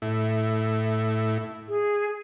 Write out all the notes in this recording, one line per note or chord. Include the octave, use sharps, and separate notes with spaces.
A2 E4
G#4